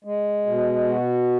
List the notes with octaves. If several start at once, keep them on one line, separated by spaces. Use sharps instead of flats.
G#3
B2
F#4